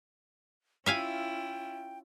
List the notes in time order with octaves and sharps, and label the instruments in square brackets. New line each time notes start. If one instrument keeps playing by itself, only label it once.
[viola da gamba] C#4 E4 F4 [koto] E5 F5 G#5 [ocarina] G5